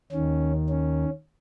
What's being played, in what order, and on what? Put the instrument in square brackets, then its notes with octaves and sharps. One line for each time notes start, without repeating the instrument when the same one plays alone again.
[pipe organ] D#2 D#3 C#4
C#4